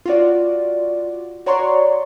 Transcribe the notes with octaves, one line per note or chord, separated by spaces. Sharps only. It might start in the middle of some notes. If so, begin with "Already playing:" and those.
F4 F#4 D5
F#4 C#5 D5 A#5 C6 C#6